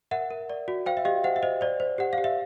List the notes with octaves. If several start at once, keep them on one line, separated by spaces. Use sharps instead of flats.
A#4 E5 F#5
A#4
D5
F#4
C5 F5 G5
E5
G4 D#5 F5
C5 E5 F#5
E5
C5 D#5
C5 D5
C5
G4 F#5
F5
G4
E5